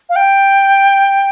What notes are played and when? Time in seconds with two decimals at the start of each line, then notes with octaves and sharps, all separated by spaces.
0.09 F5
0.16 G5